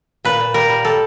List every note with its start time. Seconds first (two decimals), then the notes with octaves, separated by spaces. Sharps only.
0.25 A#2 B4
0.40 A#2
0.54 G3 A#4
0.70 G3
0.85 G3 A4